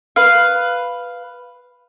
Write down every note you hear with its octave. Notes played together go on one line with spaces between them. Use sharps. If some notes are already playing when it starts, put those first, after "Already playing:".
B4 F5